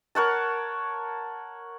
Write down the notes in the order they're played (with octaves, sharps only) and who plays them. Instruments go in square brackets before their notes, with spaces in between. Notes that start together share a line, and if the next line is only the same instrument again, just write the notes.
[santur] A#4 C#5 F#5 A5